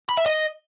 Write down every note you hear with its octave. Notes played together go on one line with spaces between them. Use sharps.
B5
E5
D#5